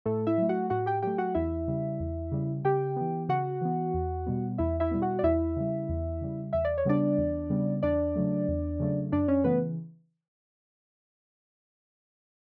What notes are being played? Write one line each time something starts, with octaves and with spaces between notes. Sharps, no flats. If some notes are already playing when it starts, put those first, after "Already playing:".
A2 A3 A4
E4 E5
F#3 A3
F#4 F#5
A2 F#4 F#5
G4 G5
F#3 A3 G4 G5
F#4 F#5
E2 E4 E5
C#3 G3
E2
C#3 G3
C#3 G4 G5
E3 B3
C#3 F#4 F#5
E3 B3
E2
B2 G3 B3
E2 E4 E5
E4 E5
B2 G3 B3
F#4 F#5
D5
E2 E4 E5
C#3 G3
E2
C#3 G3
E2 E5
D5
C#5
C#3 G3 B3 D4 D5
E2
C#3 G3 B3
E2 D4 D5
C#3 F#3 A3
E2
C#3 F#3 A3
F#2 D4 D5
C#4 C#5
C#3 E3 A3 B3 B4